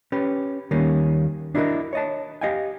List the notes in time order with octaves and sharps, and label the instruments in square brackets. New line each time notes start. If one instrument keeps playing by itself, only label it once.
[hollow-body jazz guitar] C#4 G4 B4
D#2 D#3 G3 A#3 C#4
D4 E4 F#4 G#4 A#4 D#5
C#5 D#5 A5
G4 D#5 F5 G5 G#5